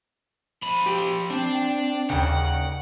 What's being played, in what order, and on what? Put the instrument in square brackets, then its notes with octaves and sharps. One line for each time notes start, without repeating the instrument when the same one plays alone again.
[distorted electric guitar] F3 B5
[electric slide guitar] G4
[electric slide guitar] C4 [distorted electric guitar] D4
[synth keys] G5
[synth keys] D#2 C#3 [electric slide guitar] A#4 D5 G5 [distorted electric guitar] F#5